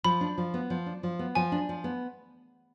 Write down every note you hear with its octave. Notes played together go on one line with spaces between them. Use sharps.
F3 B5
D4
F3
B3
F3
D4
F3
B3
F3 G#5
D4
F3
B3